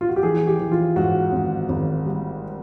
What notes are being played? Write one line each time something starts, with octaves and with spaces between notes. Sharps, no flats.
F4
F#4
G4
E3 G#4
G4
E3
F4
G#2 F#4
G#1
G#1
G3